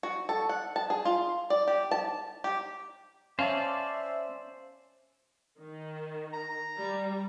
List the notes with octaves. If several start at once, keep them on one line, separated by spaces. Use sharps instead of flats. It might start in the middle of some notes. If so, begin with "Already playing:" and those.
F#4
A4
F#5
A5
G#4
F4
D5
G4
A5
G4
C#4 C5 D5 E5 F5 G#5 A5
D#3
A#5
G3